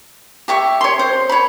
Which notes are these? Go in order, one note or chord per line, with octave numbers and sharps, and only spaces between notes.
G4 E5 C#6
C#5 C6
C5
C#5 B5